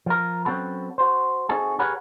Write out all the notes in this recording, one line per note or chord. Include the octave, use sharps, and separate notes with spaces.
F3 A#4
F#3 C4 C#4 F#4 A4 B4
F#4 C5
C4 D#4 F#4 G#4 A4
G4 G#4 A#4 B4 C#5 F#5